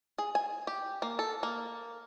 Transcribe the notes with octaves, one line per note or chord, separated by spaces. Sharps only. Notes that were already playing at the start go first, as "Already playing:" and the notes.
G#4
G#5
G4
A#3
A4
A#3